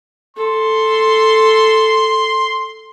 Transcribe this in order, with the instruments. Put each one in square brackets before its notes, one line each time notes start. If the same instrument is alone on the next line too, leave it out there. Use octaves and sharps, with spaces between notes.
[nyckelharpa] A4 [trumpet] C6